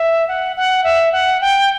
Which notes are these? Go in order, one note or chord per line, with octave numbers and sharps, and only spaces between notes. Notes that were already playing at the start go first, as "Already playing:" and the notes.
Already playing: E5
F#5
F#5
E5
F#5
G5